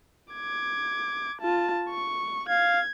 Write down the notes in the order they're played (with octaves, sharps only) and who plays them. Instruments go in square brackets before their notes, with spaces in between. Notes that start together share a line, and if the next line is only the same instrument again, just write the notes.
[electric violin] D6 G#6
F4 A5
C#6
[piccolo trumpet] F5 [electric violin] G#6